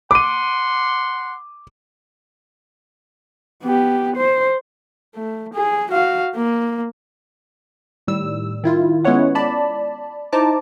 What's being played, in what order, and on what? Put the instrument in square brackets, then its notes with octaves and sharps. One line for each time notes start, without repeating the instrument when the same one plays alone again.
[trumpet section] F#5 C6 [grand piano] D6 D#7
[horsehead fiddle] B3 G4
C5
A3
G#4
F#4 F5
A#3
[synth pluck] A2 D#3 G3 E6
D#3 E4 F4
G#3 B3 C#4 E4 C#5 F#5
D5 A5 B5
D#4 E4 C5 A5 A#5 D6